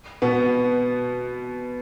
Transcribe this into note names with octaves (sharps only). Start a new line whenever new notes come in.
B2 B3